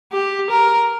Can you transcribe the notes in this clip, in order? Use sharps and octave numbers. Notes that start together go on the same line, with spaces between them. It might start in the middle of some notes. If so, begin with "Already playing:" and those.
G4
A#4